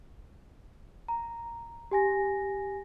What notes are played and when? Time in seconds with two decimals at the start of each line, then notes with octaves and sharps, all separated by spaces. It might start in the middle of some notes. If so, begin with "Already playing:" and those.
1.08 A#5
1.91 G4 G#5 A#6